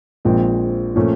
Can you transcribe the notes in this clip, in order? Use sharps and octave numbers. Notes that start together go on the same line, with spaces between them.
A#1 A#2 F3 G#3 C4
A#2 F3 A3 C#4